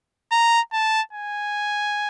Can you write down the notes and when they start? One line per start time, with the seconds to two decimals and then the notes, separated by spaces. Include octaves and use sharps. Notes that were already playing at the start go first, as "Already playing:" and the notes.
0.32 A#5
0.73 A5
1.13 G#5